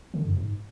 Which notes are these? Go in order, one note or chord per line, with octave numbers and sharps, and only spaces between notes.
D3
F#2
G#2